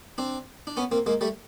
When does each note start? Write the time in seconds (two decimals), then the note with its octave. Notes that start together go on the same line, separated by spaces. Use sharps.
0.18 C4 D4
0.67 D4
0.77 B3 C#4
0.92 A#3 C4
1.06 G#3 A#3
1.21 G3 A3